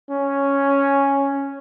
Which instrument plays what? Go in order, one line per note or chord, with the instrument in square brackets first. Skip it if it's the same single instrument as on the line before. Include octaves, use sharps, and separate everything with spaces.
[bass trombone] C#4